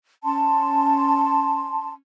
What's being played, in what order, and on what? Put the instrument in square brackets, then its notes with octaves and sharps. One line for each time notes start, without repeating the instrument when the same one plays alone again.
[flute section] C#4 A5 C6